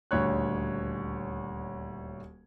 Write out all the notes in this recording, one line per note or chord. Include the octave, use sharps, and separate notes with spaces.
D#1 D2 C#5 F#6